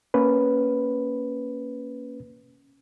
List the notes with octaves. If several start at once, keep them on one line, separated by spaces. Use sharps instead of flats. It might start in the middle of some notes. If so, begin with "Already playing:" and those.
A#3 C#4 B4